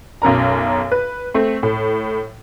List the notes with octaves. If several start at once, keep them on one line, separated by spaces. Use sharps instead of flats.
B1 F#2 A#4 A#5
B4
A3 C4
A2